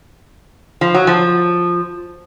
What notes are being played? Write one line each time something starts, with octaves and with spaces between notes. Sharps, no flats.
F3
F#3
F3